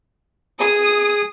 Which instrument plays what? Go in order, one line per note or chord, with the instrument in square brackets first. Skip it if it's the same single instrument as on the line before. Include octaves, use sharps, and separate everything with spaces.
[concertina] G#4 [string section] D#6